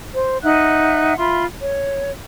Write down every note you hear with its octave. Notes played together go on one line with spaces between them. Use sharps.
C5
D#4 E5 F#5 F#6
F4 E5 B5 C6
C#5